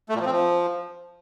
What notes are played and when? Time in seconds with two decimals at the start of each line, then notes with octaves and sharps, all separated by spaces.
0.09 A3
0.15 A#2
0.20 F3
0.26 C4
0.31 F3